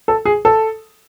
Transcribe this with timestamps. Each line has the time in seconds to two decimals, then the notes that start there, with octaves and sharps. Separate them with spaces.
0.08 A4
0.25 G#4
0.45 A4